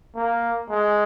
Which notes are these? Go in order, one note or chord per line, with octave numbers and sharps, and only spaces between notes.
A#3
G#3